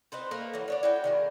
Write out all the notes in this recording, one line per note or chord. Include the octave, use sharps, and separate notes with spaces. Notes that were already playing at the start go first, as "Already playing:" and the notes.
C4 D#4 B4 C5
A3 A#3 A#4 B4
E3 F#3
D3 C#5 D5
E4 F#4 G5
D#3 G#3 A#3